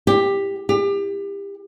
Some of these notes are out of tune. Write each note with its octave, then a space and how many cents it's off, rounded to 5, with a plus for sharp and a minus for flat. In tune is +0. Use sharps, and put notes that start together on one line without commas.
G4 +15
G4 +30